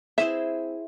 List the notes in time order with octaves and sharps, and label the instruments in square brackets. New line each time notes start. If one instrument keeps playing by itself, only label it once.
[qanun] C4 E4 G#4 C5 [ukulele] E5